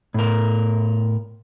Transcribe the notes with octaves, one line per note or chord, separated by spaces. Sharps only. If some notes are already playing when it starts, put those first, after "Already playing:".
A2 A#4